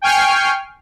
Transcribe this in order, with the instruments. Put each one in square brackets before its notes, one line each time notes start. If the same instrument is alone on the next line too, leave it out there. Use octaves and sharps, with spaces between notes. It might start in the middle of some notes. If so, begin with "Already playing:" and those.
[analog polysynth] G5 G#5 C#6 F6 C7